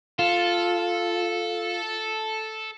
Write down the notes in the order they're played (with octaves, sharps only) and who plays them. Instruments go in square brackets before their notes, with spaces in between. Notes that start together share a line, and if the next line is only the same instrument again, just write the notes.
[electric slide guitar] F4 [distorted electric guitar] A4